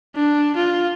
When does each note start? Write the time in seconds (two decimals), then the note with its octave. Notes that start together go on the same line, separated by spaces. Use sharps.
0.15 D4
0.56 F4